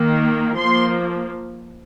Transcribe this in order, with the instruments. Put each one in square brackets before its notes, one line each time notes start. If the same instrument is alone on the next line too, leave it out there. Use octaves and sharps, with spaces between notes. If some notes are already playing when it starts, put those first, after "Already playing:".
Already playing: [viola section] D#3 A#3
F3 A#3 C6